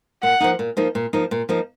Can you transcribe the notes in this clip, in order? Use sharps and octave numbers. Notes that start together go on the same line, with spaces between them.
A#2 F#5
F3 A#3 D#4
A#2
F3 A#3 D#4
A#2
F3 A#3 D#4
A#2
F3 A#3 D#4